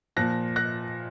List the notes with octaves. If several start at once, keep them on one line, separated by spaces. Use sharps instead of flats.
A#2 F3 F#6 A#6
F#6 A#6